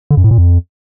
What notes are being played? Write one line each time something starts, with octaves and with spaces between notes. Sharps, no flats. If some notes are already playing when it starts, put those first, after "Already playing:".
D3
F#2
A2
A#2
F2